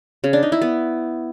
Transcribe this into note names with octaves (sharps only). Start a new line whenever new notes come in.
C#3
D4
D#4
E4
B3